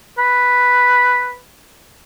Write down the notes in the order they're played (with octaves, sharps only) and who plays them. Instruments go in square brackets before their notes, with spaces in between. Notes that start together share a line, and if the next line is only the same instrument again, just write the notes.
[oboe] B4